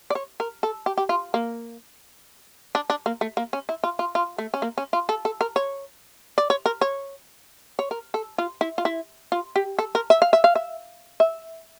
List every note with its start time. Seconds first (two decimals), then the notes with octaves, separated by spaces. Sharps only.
0.10 D5
0.15 C#5
0.40 A#4
0.63 A4
0.86 G4
0.98 G4
1.09 F4
1.34 A#3
2.75 D4
2.90 D4
3.06 A#3
3.21 A3
3.37 A#3
3.53 C#4
3.69 E4
3.84 F4
3.99 F4
4.15 F4
4.38 A3
4.54 C#4
4.62 A#3
4.78 C#4
4.93 F4
5.09 A4
5.25 A4
5.41 A#4
5.56 C#5
6.38 D5
6.50 C#5
6.66 A#4
6.81 C#5
7.79 C#5
7.91 A#4
8.14 A4
8.38 F4
8.61 E4
8.78 F4
8.85 E4
9.32 F4
9.56 G4
9.79 A4
9.95 A#4
10.10 E5
10.22 F5
10.33 E5
10.44 F5
10.55 E5
11.20 E5